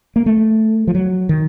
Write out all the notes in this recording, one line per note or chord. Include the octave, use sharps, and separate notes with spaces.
A#3
A3
F3
F#3
D#3